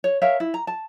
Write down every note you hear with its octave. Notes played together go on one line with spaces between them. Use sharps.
C#5
A#4 C#5 E5 F5
E4
A#5
A5